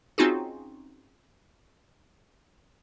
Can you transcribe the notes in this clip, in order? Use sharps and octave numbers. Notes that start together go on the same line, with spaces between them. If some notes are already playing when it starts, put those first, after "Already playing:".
C4 C#4 D#4 F4 F#4 G#4